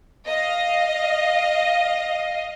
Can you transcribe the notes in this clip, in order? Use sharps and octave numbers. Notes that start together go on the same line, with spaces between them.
D#5 F5